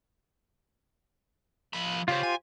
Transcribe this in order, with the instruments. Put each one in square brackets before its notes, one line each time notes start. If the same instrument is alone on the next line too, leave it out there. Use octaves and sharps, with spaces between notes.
[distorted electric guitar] F3 B5
[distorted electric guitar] C#3 [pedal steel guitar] F4 G4 C5
[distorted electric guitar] G#5